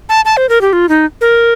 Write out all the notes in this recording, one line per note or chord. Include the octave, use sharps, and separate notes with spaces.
A5
A5
C5
A#4
G4
F4
D#4
A#4